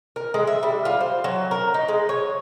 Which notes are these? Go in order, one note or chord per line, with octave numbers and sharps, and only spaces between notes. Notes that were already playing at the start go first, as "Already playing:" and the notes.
A#4
G#3
E5
G3
F4
C5
F#3
A#4
D#4
G#3
C#5